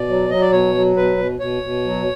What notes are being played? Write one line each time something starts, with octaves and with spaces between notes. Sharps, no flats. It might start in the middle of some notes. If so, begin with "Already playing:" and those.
Already playing: B2 D5
F#3
F#3 D#5
D5
B2 C#5
F#3
B2 B4
B2
B2 C#5
B2
F#3